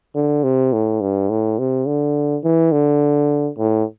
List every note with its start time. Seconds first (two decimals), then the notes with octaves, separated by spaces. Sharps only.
0.15 D3
0.44 C3
0.73 A2
1.01 G2
1.30 A2
1.59 C3
1.87 D3
2.44 E3
2.72 D3
3.58 A2